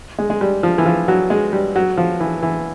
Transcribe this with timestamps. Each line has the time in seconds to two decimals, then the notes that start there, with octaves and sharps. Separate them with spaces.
0.19 G#3
0.30 G#3
0.41 G3
0.63 F3
0.78 E3
0.86 F3
1.08 F#3
1.30 G#3
1.53 G3
1.76 F#3
1.97 F3
2.20 E3
2.43 E3